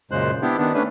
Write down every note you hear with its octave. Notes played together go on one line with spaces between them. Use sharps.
F#2 A#2 C#3 G#3 C5 F#6
B3 D4 E4 G4
D#3 B3 D4
A3 C#4 D4 B4